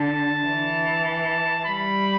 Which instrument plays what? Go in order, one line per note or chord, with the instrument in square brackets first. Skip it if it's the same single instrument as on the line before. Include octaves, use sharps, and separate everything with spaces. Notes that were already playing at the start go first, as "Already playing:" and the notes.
Already playing: [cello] D3 [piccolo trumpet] A5
[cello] E3
[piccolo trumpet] A5
[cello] G3 [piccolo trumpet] B5